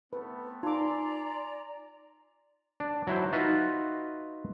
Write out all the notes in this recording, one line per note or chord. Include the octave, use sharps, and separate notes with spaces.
A3 B3 C4 B4
D#4 F4 A#4 D5 G#5 A#5 C6 D6
D4
F#3 E4 C5
D#4 F4 F#4 B4 E5 F5